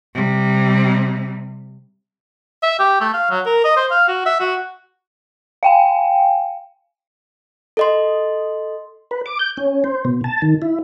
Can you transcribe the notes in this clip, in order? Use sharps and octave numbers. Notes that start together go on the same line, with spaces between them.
C3 G3
E5
G4
A3
F5
F#3
A#4
D#5
C5
F5
F#4
E5
F#4
F5 G5 G#5
A4 D#5 C6
B4
D6
G6
C#4
C5
B2
A5
D#3
E4